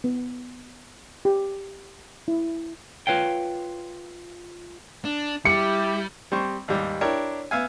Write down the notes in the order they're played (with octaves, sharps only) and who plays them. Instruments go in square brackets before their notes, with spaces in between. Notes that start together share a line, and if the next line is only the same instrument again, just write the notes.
[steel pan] B3
G4
E4
[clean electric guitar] F4 B4 C#5 F5 G5
[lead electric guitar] D4
[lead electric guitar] G3 [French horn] E4 [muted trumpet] G4 [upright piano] C#7
[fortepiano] G3 C4 C5 C#6
D#2 G#2 G3
D4 E4 G4 A#4 C#5
B3 E5 F5 G#5